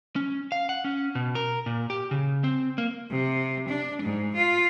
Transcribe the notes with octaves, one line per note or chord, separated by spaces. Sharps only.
C#4
F5
F#5
C#4
B2
A#4
A#2
G4
C#3
C4
A#3
C3
D4
G#2
F4